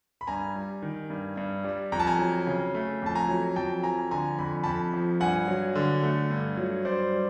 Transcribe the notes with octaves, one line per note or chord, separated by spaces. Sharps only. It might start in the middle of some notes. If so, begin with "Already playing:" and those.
B5
G2 G#5 A#5
G3
D#3
G2
G2
G3
F2 A#5
A5
G#5 A#5
F#3
C#3
A3
F2 A5
G#5 A#5
F#3
F2 G5 A5
F3 G#5 A#5
D3 G#5 A#5
F2 B5
F2 A5 B5
F3
G2 F#5 G#5
F#3
D3
A3
G2
F#3
G2 C5 D5
G3